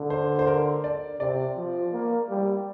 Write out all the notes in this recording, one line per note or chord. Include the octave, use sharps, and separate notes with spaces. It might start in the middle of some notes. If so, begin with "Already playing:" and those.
Already playing: D3
C5
C5
A#4
D5
C3 D5
F3
A#3
G3